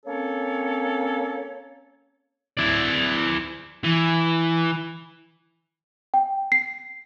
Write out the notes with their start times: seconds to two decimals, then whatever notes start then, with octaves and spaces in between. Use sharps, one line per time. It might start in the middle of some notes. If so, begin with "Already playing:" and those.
0.05 A#3 C4 C#4 A4 C#5
2.57 E4 D5
3.84 E3
6.14 G5
6.52 C7